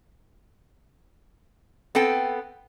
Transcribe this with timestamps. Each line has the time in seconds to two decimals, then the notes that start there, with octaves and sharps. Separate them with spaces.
1.95 B3 C4 A4 G5